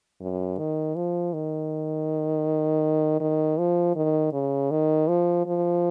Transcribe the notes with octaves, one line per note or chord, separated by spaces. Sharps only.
F#2
D#3
F3
D#3
D#3
F3
D#3
C#3
D#3
F3
F3